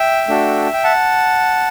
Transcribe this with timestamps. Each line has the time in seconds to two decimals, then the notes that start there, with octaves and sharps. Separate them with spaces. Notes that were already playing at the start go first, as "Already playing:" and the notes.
Already playing: E5 G5
0.28 A3 D4 F#4 A4
0.74 G5
0.84 F#5 A5